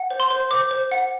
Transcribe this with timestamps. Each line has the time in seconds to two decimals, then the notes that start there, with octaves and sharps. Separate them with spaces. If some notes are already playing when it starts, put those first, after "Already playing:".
Already playing: F#5
0.10 C5
0.20 C6
0.31 C5
0.51 C5 D6
0.71 C5
0.92 F#5